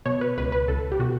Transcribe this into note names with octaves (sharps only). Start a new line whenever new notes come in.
B2 C#5
B4
C#2 B4
B4
C#2 A4
G4
B2 F#4